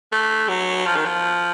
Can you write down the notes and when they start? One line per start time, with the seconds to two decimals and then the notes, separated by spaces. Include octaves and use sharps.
0.12 A3
0.49 F#3
0.86 F3
0.96 D#3
1.05 F3